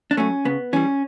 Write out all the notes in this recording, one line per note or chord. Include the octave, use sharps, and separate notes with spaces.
D4
F#3 A3 C#4
C#3 B3
E3 G3 C#4